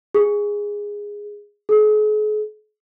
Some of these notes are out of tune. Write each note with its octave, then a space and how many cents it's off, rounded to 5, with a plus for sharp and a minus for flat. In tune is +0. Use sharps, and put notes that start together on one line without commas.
G#4 -10
G#4 +45